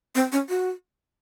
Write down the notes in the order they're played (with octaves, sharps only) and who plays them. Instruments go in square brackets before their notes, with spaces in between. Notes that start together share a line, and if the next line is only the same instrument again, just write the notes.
[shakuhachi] C4
C#4
F#4